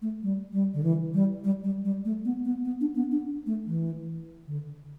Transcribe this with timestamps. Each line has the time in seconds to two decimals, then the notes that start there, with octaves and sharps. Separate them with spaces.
0.02 A3
0.23 G3
0.53 G3
0.74 D3
0.83 E3
1.14 G3
1.44 G3
1.64 G3
1.85 G3
2.05 A3
2.25 B3
2.45 B3
2.65 B3
2.81 D4
2.96 B3
3.11 D4
3.46 A3
3.66 E3
4.47 D3